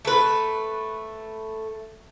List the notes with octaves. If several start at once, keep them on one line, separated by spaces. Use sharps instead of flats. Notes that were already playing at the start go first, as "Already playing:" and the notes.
A3 B4